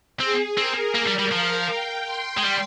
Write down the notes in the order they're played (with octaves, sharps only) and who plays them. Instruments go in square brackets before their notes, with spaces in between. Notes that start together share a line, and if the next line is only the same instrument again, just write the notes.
[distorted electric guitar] C4 [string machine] G#4
[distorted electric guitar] C4 [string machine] A#4
[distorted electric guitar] A#3
G3
G3
[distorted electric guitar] F3 [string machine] F5
[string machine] G5
C6
[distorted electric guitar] G#3
G3